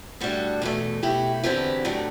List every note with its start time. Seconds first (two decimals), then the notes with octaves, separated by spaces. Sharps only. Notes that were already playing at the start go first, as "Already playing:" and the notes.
0.20 A2 G3 D4 F#4 A4
0.62 E2 B2 A3
1.03 B2 A3 E4 G4
1.43 E2 D3 F#3 C4 E4 G4 B4
1.85 A2 F#3 A3 D4